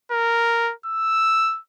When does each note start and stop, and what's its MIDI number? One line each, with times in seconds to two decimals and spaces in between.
0.11 0.72 70
0.86 1.59 88